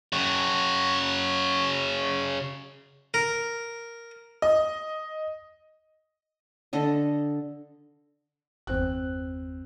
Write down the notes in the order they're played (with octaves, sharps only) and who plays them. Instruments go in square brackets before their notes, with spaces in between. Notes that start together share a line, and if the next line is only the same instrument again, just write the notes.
[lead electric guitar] C#3 F#4
[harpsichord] A#4
[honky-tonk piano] D#5
[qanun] D3 A4 D#5
[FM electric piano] G1 E2 [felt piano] C4 F#6